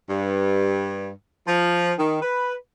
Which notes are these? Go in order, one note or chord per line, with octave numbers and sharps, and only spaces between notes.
G2
F3
D#3
B4